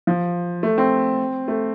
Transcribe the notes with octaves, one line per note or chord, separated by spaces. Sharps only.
F3
A3
C4
A3